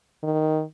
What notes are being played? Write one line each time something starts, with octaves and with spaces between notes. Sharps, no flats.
D#3